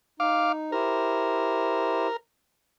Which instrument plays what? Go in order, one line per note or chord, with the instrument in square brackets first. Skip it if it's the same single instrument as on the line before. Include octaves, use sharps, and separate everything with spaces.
[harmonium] D#4 [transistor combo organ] F5 D6
[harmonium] E4 G4 C5 [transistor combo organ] A#4